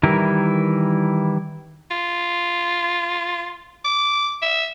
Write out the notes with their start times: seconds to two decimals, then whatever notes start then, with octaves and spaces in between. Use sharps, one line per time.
0.03 D#3 E3 G3 E4 A#4
1.91 F4
3.85 D6
4.42 E5